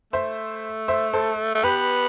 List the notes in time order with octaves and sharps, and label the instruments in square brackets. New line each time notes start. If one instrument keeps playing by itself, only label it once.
[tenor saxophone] A3 [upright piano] C5 E5
[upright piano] C5 E5
A4 C5
[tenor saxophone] A3
[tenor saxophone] B3 [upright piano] G4 B4